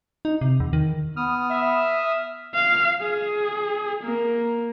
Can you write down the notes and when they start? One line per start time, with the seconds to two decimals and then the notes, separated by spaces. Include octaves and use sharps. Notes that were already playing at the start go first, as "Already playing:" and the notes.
0.25 D#4
0.41 C3
0.60 E2
0.73 D#3
1.17 B3 D#6 F6
1.50 E5
2.54 F5
3.02 G#4
4.03 A#3